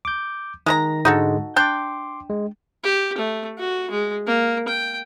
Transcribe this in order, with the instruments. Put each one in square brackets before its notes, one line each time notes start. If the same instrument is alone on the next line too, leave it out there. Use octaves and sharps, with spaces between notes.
[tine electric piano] D6 G6
[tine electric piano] D#3 A#6 [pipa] G#3 A#4 A#5
[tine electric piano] G#2 D3 G#3 [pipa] D#4 F#4 A4
[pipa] D4 G5 [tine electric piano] C6 D6
[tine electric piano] G#3
[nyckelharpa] G4
A3
F#4
G#3
A#3
G5